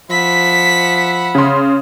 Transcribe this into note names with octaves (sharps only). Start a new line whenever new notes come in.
F3 E5 F#5 B5 B6
C#3 C6